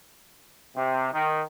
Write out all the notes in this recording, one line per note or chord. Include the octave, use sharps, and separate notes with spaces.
C3
D#3